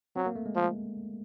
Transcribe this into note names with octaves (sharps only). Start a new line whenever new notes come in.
F#3 C4
A#3
A3
G#3
F3